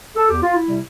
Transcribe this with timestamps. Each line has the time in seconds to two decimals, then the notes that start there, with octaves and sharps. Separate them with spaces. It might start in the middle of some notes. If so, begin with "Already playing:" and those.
0.15 A4
0.29 E2 G4
0.43 F4
0.56 E4
0.68 C3 G3